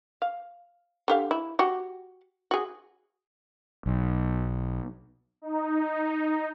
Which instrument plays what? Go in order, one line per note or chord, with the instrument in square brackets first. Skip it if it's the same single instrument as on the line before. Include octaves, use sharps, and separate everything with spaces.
[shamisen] F5
D3 G4 F5
E4
F#4 G4
F#4 G#4
[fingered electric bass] B1
[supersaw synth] D#4